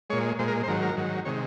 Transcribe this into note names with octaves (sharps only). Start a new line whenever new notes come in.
A#2 G#3 C#5
A#2 G#3 C5
A#4
C5
G#2 D#3 F#3 A#4
A#4
G#2 D#3 F#3
C3 D#3 G#3 C#5